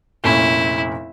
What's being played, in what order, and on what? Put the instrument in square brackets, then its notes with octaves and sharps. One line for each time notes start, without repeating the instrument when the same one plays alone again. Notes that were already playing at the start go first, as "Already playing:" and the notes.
[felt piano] F1 A#2 C#4 [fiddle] E4